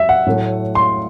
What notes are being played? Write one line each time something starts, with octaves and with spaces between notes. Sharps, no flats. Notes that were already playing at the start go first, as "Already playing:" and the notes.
Already playing: F#3 E5
F#5
A2 F#3 A3
C6